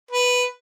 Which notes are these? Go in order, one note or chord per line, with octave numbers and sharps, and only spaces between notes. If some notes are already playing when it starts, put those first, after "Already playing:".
B4